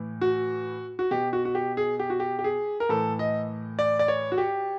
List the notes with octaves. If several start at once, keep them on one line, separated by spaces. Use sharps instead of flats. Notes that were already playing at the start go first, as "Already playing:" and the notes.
Already playing: A2 E3
F#4
F#4
B2 G4
F#4
F#4
G4
G#4
G4
F#4
G4
G4
G#4
A#4
A2 E3 A4
D#5
D5
D5
C#5
F#4
G4